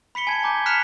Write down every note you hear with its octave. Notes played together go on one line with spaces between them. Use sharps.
B5 B6 C#7 G7
G#5 A5 G#6
A#5 D6 G6
F6 F#6 B6 C#7 E7 F7